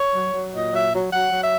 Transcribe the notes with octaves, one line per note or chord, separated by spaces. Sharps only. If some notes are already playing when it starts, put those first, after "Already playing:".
Already playing: C#5
F#3
F#3
A#2 D#5
F#3 E5
F#3
F#3 F#5
F#3
E5